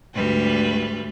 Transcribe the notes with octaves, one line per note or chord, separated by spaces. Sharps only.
D2 G#2 G3 B4